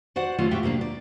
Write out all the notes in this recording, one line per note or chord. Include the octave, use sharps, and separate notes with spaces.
F#4 C5 D5 F#5
G#3 A3 C#4 F4 F#4
A2 F3 F#4 G4 E5 G5
C3 G#3 A#3 D4
D5